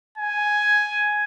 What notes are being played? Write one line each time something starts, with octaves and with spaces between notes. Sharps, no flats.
G#5